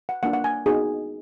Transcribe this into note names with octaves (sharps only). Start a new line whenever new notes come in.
F#5
A#3 D4 F4 F#5
F#5
G#5
B3 D#4 F#4 G#4